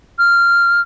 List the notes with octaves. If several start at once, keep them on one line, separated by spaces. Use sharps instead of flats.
F6